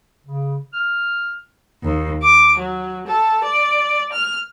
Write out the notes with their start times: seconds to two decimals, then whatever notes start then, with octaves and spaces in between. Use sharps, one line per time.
0.25 C#3
0.73 F6
1.82 D#2
2.22 D6
2.58 F#3
3.07 A4
3.44 D5
4.12 F6